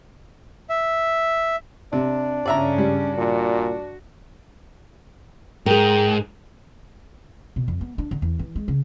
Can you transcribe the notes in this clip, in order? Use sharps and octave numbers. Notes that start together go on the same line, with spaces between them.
E5
C3 D4
G2 C#3 C#4 D5 E5 A#5
G3
A#2 F#4
G#2 G#4 A#4 G5
B2
F2
B3
D4
D3
E2
E3
G#3
C#3